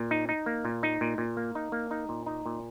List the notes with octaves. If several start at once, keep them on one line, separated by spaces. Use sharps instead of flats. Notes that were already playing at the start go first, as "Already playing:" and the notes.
Already playing: A#2
D#4
D#4
A#3
A#2
D#4
A#2
A#2
A#3
D#4
A#3
D#4
A#2
D#4
A#2